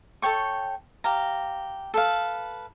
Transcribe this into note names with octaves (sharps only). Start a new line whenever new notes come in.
A4 C#5 G5 C#6
G4 F5 A#5
A4 B4 F5